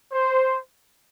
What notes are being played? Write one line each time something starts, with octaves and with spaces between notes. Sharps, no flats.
C5